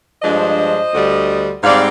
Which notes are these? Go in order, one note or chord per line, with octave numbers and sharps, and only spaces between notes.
G2 F3 G#3 D4 C5 D#5
D2 D3 G3
G#2 G3 C4 D5 F5